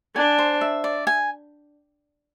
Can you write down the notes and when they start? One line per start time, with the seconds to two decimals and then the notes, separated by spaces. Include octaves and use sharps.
0.16 D4 G#5
0.38 C5
0.61 E5
0.84 D5
1.07 G#5